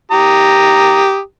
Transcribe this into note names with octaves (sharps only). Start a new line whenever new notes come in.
G4 A#5 D#6